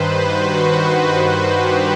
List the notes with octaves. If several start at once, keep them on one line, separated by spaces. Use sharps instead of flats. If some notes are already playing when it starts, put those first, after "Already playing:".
Already playing: G2 D#3 B4 C5
F#4
F#4
G4